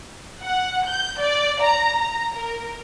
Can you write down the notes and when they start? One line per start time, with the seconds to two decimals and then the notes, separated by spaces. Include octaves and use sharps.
0.42 F#5
0.87 G6
1.20 D5
1.61 A#5
2.01 A#5
2.34 A#4